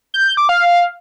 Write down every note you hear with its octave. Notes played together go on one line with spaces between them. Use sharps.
G6
G6
D6
F5